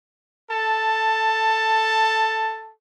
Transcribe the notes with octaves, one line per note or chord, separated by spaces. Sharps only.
A4 A5